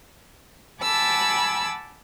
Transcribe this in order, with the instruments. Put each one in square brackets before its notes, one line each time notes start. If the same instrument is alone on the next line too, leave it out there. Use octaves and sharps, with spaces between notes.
[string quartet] F#5 G#5 A5 B5 D6 E6